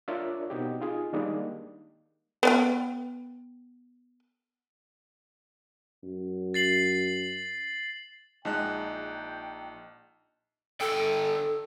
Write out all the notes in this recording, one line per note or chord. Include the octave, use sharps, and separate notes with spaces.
D4 F4 A#4 C#5 D5 E5
B2 C4 D#4 F#4 G4
D#4 F4 G#4
D#3 G3 G#3 A#3 D4 D#4
B3 D5 G5
F#2
A6 C7 F#7
A#1 G#3 D#4 F#5 G5 A5 F#6
D3 A4 G5